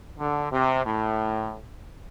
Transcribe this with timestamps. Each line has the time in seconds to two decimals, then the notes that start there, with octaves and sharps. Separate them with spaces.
0.19 D3
0.52 C3
0.86 A2